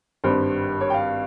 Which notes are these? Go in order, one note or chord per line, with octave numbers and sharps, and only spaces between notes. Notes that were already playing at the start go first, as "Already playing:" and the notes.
G#1 G2 G3 C5
C#5
G5
F5